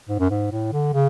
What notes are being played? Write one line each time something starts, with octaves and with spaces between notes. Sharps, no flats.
G#2
F#2
G#2
A2
D3
C#3